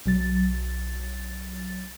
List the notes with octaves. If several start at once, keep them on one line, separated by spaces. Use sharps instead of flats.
B1 F#3 A6